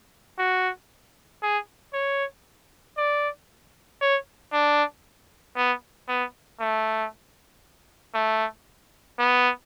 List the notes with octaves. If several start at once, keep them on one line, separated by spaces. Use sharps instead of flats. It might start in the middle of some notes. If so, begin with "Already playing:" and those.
F#4
G#4
C#5
D5
C#5
D4
B3
B3
A3
A3
B3